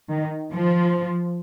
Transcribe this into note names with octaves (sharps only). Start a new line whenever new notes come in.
D#3
F3